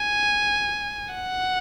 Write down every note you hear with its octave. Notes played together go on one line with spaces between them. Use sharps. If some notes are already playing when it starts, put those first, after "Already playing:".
Already playing: G#5
F#5